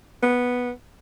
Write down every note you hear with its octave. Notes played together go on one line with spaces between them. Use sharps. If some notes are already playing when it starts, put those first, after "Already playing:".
B3